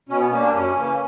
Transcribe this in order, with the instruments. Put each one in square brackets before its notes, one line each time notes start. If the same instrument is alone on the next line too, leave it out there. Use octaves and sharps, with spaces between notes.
[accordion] B2 C#4
B3
G3 A#3 C#4
D4
F#2 C#4
C#3 E3 A#3